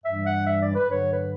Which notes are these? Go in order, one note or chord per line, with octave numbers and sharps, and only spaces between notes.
G2 E3 G3 E5
F#5
E5
D5
B4
G2 D3 F#3 C#5
B4